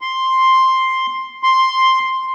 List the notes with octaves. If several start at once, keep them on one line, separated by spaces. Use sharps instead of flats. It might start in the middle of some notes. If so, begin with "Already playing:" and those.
C6
C6